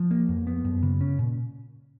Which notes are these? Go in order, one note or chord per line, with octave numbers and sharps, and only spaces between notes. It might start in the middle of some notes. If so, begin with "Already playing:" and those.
Already playing: F3
A#3
F2
B3
F#2
C#3
C#4
A#2